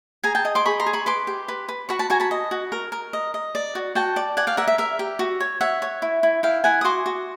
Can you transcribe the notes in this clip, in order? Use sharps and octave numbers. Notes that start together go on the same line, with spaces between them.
G#4 G#5 A#5
G5 A5
D#5
C6 D6
G#4 B5 C#6
A#5 C6
G#4
B5 C#6
B4 C6 D6
G4
B4
B4
F#4 B5 C#6
A5 B5
F#4 G#5 A#5
A5 B5
D#5
F#4
A#4
A#4
D#5
D#5
D5
F#4
F#4 G5 A5
D5
D5 F#5 G#5
F5 G5
A#4 E5 F#5
E5
A#4 E5
G4
F#4
C#5
C#5 E5 F#5
C#5
E4
E4
E4 F5 G5
E4 F#5 G#5
D#6
F#4 C6 D6
F#4